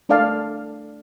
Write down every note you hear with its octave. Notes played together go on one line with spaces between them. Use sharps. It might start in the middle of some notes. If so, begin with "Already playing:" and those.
A3 D4 A4 D5 F5 A5